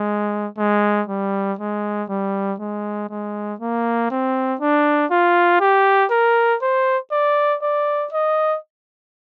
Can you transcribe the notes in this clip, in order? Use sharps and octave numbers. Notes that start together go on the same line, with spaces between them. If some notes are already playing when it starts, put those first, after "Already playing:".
Already playing: G#3
G#3
G3
G#3
G3
G#3
G#3
A#3
C4
D4
F4
G4
A#4
C5
D5
D5
D#5